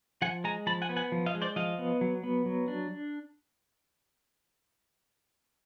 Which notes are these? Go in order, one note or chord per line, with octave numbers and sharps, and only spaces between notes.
F3 F#5 G#5
G#3 G#5 A#5
F3 A5 B5
F#5 G#5
B3
F#5 G#5
F3
D#5 F5
G#3
C5 D5
F3 D#5 F5
B3
F#3
B3
F#3
D4